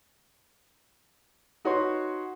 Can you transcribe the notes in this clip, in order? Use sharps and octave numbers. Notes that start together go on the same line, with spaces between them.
D#4 F#4 B4 C#5 C6